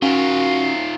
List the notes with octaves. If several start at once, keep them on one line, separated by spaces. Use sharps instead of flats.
D#3 C#4 F4 F#4